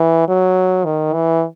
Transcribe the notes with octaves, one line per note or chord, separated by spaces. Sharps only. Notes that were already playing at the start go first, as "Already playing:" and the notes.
Already playing: E3
F#3
D#3
E3